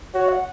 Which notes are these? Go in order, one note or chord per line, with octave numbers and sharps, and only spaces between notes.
F#4 C#5
F#5